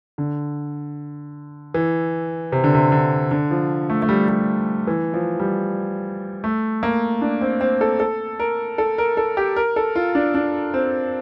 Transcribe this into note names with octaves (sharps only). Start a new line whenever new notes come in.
D3
E3
C3
D3
C3
D3
D3
F3
A3
A3
G3
G3
E3
F3
G3
A3
A#3
D4
C4
C4
A4
A4
A#4
A4
A#4
A4
G4
A#4
A4
F4
D4
D4
C4